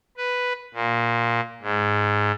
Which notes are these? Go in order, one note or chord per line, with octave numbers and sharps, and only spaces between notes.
B4
A#2
G#2